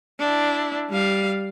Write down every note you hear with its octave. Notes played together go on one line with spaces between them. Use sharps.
D4 E4
G3 F5